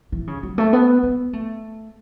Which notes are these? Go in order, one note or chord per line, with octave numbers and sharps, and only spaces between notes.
E3
C#3
F#3
A3
B3
B3
A3